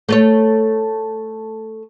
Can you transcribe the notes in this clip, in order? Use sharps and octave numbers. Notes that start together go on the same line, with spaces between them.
A3 A4 C#5